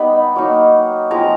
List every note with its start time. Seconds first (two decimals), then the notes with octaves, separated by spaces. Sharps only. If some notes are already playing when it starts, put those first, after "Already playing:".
Already playing: G3 B3 D#4 B5
0.36 F#3 A#3 D#4
1.11 F3 G#3 C4 D#4 A#5